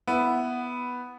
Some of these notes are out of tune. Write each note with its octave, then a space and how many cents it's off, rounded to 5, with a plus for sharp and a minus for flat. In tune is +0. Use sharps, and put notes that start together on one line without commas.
B3 +0 E4 +0